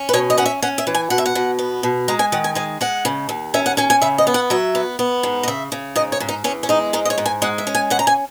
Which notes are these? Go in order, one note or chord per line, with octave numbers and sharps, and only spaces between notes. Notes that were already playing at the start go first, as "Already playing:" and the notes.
Already playing: C#4
B4
B2 C#5
D#5
C#4 F#5
E5
C#4 F#5
E5
E3
G#5
B2 F#5
E5
F#5
B2
B3
B2
G#3 A#5
G#5
D#3 F#5
G#5
G#3 G#5
G#3 F#5
C#3
D#2
C#4 E5
F#5
C#4 G#5
G#5
C#3 E5
D#5
B3
F#5
F#3 E5
B3
B3
G#2
D#5
C#3 E5
C#3
G#2 D#5
C#5
G#2
D#4
E2 C#4
C#4
G#3 D#4
G#2 D#4
D#5
C#5
G#2
G#5
G#3 F#5
E5
C#4
G#5
C#3 F#5
A#5
G#5